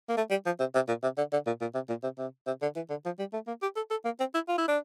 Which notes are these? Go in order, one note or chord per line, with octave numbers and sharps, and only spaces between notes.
A#3
A3
G3
F3
C3
C3
A#2
C3
D3
D3
A#2
A#2
C3
A#2
C3
C3
C3
D3
E3
D3
F3
G3
A3
A#3
G4
A4
A4
A#3
C4
E4
F4
E4
D4